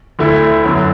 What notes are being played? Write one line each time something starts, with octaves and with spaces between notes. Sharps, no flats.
D2 D3 A3 E4
F#2 D3 F#3 B3